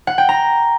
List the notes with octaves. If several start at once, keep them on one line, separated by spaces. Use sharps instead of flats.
F#5
G5
A#5